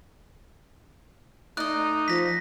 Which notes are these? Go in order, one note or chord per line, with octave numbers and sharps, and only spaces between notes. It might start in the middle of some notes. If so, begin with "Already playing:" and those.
A3 D#4 D5 D#5 F#6
F3 A#6 B6